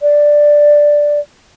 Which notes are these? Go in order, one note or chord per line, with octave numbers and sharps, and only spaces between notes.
D5